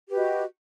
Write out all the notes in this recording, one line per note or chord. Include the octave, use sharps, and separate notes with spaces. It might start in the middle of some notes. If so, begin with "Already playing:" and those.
F#4 G4 B4 D#5